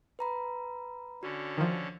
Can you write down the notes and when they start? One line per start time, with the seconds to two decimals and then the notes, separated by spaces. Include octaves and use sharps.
0.19 B4 A#5 B5
1.23 D3 C#4 F#4
1.57 D#3 F3